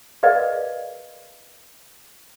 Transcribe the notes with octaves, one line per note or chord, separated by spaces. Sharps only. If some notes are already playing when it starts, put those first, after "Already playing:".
G#4 A#4 B4 D5 D#5 F5